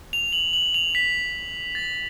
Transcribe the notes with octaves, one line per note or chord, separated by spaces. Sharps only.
F7
F#7
F#7
F7
B6
A6